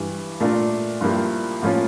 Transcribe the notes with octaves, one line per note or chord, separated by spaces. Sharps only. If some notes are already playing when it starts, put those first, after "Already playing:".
Already playing: G2 E3 G3
A#2 A3 D4 F4 A#4
G2 F3 A#3 E4 G4
A2 F3 A#3 C#4 F4